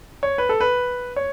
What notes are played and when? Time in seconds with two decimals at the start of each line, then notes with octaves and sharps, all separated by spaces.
0.23 C#5
0.38 B4
0.49 A4
0.60 B4
1.16 C#5